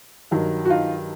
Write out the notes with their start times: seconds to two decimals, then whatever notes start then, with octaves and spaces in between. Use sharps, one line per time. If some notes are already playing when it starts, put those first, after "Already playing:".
0.31 G2 D#3 F#3
0.65 F#4
0.70 D#4 F4